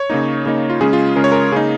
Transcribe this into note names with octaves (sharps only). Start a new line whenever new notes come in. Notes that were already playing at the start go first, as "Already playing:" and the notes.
Already playing: C#5
C#3 A#3 D#4
C#3 A#3 D#4
F4
C#3 G#3 C#4 G#4
F4
C#3 G#3 C#4 A#4
C#5
A#4
C#3 A#3 D#4 G#4